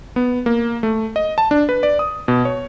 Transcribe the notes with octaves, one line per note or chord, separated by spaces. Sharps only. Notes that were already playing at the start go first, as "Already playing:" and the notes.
B3
A#3
A3
D#5
A5
D4
B4
D5
D#6
B2
C#5